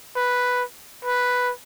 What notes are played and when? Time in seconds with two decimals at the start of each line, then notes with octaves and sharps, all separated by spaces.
0.16 B4
1.05 B4